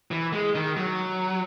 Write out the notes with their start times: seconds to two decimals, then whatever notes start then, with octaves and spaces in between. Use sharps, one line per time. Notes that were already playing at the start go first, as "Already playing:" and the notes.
0.11 E3
0.33 G#3
0.55 D#3
0.77 F#3